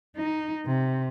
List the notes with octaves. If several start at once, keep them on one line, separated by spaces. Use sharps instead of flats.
D#4
C3